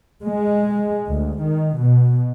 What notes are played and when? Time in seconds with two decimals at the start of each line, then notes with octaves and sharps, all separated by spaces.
0.24 G#3
1.09 D2
1.44 D#3
1.81 B2